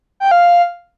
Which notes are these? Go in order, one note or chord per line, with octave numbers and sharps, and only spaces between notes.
G5
F5